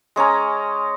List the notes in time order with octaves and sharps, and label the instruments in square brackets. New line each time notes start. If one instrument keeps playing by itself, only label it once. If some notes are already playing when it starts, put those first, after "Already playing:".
[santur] G#3 C#4 G#5 A#5